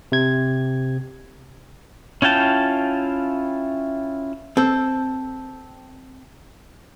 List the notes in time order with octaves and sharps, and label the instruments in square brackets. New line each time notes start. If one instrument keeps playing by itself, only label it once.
[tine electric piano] C3 G#6
[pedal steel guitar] C#4 E4 F4 G5 A5
[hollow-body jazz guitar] C4 A4